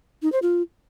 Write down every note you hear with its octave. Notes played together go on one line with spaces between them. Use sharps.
D#4
C5
F4